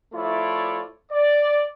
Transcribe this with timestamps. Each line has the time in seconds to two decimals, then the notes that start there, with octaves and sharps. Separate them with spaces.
0.13 F3 A3 E4 F4 C#5 D5
1.11 D5